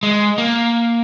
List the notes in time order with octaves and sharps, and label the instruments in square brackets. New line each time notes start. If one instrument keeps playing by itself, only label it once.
[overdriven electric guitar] G#3
A#3